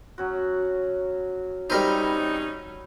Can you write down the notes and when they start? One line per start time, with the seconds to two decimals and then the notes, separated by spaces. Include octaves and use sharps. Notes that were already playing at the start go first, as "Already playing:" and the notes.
0.18 F#3 C#4 F#4
1.70 G3 C4 C#4 D#4 A#4 C5 E5 B5